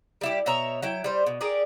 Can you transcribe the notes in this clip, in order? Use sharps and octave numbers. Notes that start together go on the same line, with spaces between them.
G3 E4 G4
B2 C#5 E5 A#5
F#3 E4 G5
G3 C5
B2
G4 G#4 A#4 D5